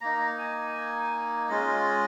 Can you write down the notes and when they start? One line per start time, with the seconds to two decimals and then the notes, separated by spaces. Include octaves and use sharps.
0.01 A#3 D#4 A#5
0.39 G#5
1.49 G#3 C#4 F4 D#5